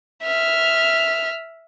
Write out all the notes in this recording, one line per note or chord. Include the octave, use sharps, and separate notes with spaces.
E5 F6